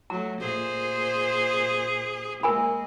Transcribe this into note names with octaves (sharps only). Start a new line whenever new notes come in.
F#3 A3 A#5
A#2 G#4 C5
G#3 A#3 A#4 G#5 B5